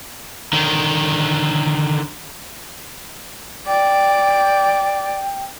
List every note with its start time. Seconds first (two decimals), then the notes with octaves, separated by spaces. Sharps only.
0.53 D3 D#3
3.67 D5 G5